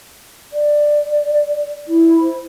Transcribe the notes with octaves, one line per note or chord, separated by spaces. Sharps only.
D5
E4
C5